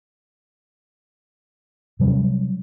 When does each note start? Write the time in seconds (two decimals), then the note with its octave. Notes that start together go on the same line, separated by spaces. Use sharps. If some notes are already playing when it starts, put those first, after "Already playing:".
2.00 C3 F#3 G3 C#4